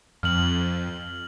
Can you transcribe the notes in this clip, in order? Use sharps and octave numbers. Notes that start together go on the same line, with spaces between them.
F2 F6 F#7